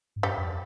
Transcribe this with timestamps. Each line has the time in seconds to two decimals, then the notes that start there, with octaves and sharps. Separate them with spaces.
0.16 G#2
0.23 G2 G3 G4
0.37 F2